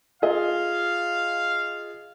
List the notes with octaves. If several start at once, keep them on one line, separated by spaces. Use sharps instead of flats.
F4 G#4 D#5 F5